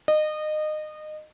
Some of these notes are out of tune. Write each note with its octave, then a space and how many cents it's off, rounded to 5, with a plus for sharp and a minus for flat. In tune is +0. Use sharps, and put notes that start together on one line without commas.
D#5 -25